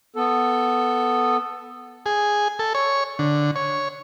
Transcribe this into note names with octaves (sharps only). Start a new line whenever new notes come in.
B3 A4
G#4
A4
C#5
D3
C#5